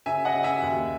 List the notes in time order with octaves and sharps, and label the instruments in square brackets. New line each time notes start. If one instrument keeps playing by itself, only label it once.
[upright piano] C#3 E5 G#5
D#5 F#5
C#3
E5 G#5
D#2